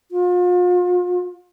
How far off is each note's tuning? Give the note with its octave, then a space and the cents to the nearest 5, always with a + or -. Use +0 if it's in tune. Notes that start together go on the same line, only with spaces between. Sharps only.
F4 +40